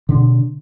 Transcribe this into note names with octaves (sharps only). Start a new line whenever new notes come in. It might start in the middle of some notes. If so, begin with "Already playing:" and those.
B2 D3 D4